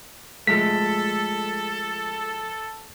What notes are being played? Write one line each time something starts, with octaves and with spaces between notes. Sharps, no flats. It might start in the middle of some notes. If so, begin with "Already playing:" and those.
F3 G#3 A3 A4 B6